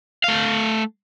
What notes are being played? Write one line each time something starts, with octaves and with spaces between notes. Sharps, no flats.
A3 F5